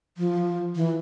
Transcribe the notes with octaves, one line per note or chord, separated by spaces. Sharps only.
F3
E3